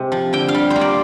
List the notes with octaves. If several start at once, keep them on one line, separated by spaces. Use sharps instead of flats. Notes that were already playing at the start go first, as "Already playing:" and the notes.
Already playing: C3 G#3 C4
F3
D3 G5
F5
G3
C5
A#3
D5